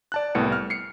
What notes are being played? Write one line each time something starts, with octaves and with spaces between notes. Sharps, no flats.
D5 A5 F#6
C2 A2 B3 C#7
F6
C7 C#7